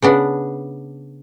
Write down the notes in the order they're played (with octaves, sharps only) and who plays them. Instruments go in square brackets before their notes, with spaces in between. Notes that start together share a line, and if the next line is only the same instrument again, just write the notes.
[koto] C#3 B3 D4